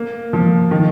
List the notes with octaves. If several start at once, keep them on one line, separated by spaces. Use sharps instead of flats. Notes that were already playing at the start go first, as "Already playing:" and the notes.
Already playing: A#3
F3
D#3